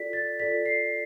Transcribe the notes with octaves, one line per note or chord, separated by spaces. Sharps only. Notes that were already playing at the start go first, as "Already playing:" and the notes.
Already playing: F4 A4 D5 B6
A6
F4 A4 D5 B6
C7